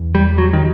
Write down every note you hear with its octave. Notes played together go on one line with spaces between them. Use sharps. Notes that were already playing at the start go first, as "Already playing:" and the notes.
Already playing: E2
E2 G3
E2 F#3
D#3